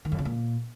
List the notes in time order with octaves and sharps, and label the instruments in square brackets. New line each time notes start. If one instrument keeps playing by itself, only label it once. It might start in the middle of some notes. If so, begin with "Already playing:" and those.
[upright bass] D#3
F2
C#3
A#2